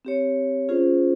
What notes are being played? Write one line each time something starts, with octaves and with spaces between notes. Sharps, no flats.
C4 G4 C#5
C#4 F4 G#4 C5